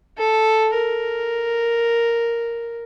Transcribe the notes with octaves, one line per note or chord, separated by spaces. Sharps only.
A4
A#4